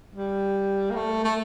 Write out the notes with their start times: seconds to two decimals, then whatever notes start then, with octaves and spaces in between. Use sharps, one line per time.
0.15 G3
0.90 A#3
0.95 A3
1.24 A3